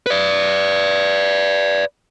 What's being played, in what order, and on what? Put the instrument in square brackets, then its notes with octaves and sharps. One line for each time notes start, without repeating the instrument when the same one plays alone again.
[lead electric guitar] B4 D5